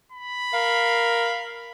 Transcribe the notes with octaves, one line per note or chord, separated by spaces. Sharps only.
B5
A#4 F5